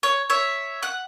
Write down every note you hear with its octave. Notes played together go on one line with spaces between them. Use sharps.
C#5
C#5 E5
F#5 F#6